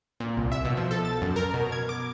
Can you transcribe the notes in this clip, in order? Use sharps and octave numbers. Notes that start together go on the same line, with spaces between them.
A#2
C2
E5
B2
F3
A4
A6
F#2
A#4
B2
G#6
D6